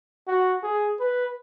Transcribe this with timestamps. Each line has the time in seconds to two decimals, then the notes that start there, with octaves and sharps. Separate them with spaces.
0.27 F#4
0.63 G#4
1.00 B4